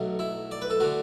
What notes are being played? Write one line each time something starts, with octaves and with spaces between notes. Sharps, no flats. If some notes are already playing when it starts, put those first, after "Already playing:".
Already playing: B1 B2 F#3 A3
E4
D5
B4
A4
D3 A3 F#4